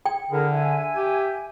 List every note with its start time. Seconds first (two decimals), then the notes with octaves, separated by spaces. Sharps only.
0.06 G5
0.31 D3 E4 G#4 A#4
0.52 E5 G#5
0.96 G4